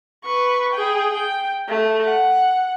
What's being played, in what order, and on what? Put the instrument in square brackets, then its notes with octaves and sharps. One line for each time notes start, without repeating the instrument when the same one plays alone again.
[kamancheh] B4 C#6
G#4 G5
G5
A3
F#5